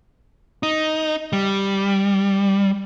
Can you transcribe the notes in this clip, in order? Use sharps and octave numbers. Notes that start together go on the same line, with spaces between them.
D#4
G3